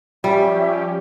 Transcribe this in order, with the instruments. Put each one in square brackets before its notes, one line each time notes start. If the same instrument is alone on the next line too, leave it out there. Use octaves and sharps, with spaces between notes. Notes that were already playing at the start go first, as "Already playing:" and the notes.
[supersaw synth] F3 C#4 G4 [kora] G3 [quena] E5